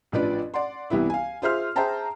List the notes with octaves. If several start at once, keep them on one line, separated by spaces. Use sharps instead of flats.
A1 F3 D4 B4 D5
D5 F#5 C6
C2 E3 G3 B3 E4
F5 G#5
F4 G#4 C5 E5 C6 F6
G#4 C5 E5 G5 A5 A#5